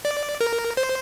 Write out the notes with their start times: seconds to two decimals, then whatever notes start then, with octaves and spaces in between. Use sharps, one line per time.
0.05 D5
0.41 A#4
0.77 C5